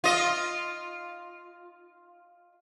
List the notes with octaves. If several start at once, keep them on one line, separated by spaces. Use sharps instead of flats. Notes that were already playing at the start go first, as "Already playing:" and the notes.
F4 D#5